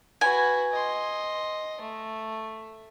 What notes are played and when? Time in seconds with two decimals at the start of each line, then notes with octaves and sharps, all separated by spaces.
0.21 F#4 B4 G#5
0.72 D#5 C6
1.81 A3